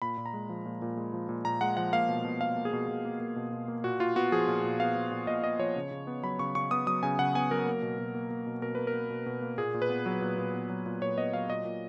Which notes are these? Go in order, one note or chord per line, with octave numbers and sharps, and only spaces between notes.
A#2 B5
A#2
A#5
G#3
F3
A#2
A#2
G#3
F3
A#2
A#2 A#5
G#3 F#5
F3 F#5
A#3 F5
B2
B2
A#3 F5
A#3
G#4
B2
B2
A#3
A#3
B2
B2
A#3
A#2 F#4
A#2 F4
B3 F#4
F3 G#4
A#2
A#2
B3 F5
F3
A#2
A#2 D#5
B3 D#5
F3 C#5
C#3
C#3
B3
F#3 B5
C#3 C#6
C#3 C#6
B3 D#6
F#3 D#6
C#3 G#5
C#3 F#5
B3 G#5
F#3 A#4
A#3
B2
B2
A#3
A#3
B2
B2 A#4
A#3 B4
A#4
A#3
B2
B2
A#3
A#2 G#4
A#2
B4
B3
F#3
A#2
A#2
B3
F#3
A#2
A#2 C#5
B3 D#5
F#3 F5
A#2 D#5
A#2